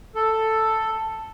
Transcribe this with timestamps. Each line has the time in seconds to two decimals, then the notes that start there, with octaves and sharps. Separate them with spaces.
0.15 A4